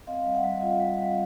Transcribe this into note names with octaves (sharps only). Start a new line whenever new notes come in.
C4 D#5 F5
G3
E5 F#5
G3
F4 D#5 F5
G3
G3